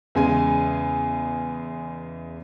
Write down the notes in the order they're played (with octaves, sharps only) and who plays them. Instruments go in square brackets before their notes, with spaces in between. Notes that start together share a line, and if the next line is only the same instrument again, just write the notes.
[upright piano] E2 C#3 G#3 G#5